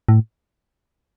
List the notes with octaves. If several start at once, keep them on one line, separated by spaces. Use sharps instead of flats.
A2